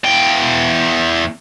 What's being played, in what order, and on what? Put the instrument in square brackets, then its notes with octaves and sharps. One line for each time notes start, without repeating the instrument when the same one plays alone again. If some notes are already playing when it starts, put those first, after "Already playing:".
[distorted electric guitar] E2 G5